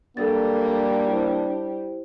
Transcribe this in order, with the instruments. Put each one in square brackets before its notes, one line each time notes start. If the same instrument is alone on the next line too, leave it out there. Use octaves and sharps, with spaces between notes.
[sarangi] G3 [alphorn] A#3 [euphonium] D4 [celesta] A4 A6
[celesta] E4 G4 C5